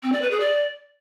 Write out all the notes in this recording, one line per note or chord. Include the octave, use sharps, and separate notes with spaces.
C4
D5
B4
G#4
D5